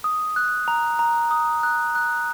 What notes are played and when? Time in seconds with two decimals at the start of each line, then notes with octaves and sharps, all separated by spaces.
0.04 D#6
0.36 F#6
0.68 A#5
0.99 A#5
1.31 D#6
1.63 F#6
1.95 F#6